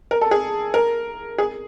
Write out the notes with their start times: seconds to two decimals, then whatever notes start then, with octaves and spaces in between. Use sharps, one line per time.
0.11 A#4
0.21 A4
0.31 G#4
0.74 A#4
1.38 G#4